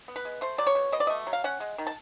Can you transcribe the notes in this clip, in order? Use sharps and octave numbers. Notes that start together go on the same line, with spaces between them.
B3
B4
G#3
A3 C5
F#3 D5
C#5
B2
B2 D#5
D5
A3 D#5
F#3
F5
C#4 F#5
G#3
D#3
A5